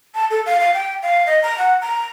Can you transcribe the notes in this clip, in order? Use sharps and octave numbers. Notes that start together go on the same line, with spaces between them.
A5
A4
F5
F5
G5
F5
D#5
A#5
F#5
A#5